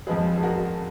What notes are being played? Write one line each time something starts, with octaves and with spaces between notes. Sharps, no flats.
F2 F3 G#3 G#4 B4
G#4
F#4 A#4